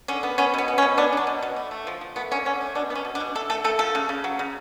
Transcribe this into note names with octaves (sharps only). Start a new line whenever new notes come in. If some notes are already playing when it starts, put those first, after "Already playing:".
D3 C#4
B3
B3 C#4
B2 B3
B3
C#4
B2
B3 D4
F#3 D4
B2
B2
A3
A3
F3
F3
A3 B3
D3 C#4
D3 C#4
A3
B2 D4
B3
C#4
B2
D4
B2
A3 A4
A3 A4
A3 A4
F3 A4
C#3
C#3
F#3
C#3